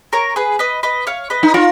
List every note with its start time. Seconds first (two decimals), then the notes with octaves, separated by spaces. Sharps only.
0.13 A#4 C#5
0.36 G#4 B4
0.59 B4 D#5
0.83 B4 D#5
1.07 C#5 F5
1.30 B4 D#5
1.43 D#4
1.54 F4 A#4 C#5